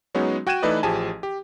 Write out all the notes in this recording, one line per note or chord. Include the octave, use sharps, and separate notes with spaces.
F#3 G#3 B3 C#4 D#4 F#4
F#4 G5 F#6 G#6 D#7 E7
E3 A3 D#4 B4 D5 D#5
A1 F3 G4 G#4 G#5 A5
G4